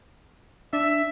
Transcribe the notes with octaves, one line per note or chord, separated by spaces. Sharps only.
D4 E5